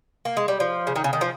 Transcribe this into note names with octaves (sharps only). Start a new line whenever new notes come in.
A#3
G#3
G3
F3
C#3
D#3
C#3
D#3
F3